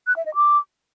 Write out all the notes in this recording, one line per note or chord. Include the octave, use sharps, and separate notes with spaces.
F#6
E5
D#5
D6